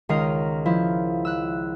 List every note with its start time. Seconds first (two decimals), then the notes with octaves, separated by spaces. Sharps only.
0.09 C#2 D#3 D#4 A#4 D#5 C7
0.65 F3 E4
1.25 E6 F#6